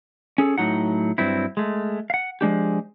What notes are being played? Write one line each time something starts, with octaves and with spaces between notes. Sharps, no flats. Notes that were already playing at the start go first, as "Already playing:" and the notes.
C#4 G#4 A4
A2 F#3 D#4 F#5
G2 F#3 C4 E4
G#3 A3
F5 F#5
F3 G#3 D4 G4